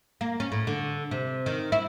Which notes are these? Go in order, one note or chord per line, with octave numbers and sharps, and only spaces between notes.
A#3
C#4
A2
D3
C3
D#3
E4